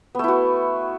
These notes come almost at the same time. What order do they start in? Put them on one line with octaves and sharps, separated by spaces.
B3 A3 E4 F#4